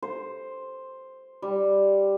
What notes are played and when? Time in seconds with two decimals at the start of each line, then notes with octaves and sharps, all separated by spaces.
0.02 C5
1.42 G3